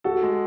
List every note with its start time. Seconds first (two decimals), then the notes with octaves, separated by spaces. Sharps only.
0.04 F#4 A4
0.23 G#3